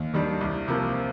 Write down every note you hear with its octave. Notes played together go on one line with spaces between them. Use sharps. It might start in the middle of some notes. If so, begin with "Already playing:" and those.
Already playing: D#2
D#3 G3 D4
C2
C3 F3 A#3 F4